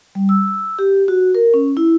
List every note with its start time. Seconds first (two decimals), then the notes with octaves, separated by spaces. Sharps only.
0.15 G3
0.29 E6
0.79 G4
1.08 F#4
1.35 A#4
1.54 C#4
1.77 E4